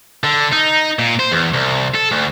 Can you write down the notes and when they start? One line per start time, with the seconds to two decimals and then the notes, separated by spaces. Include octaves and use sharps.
0.23 D3
0.52 D#4
0.99 A#2
1.19 C5
1.31 E2
1.53 C2
1.94 A4
2.11 D2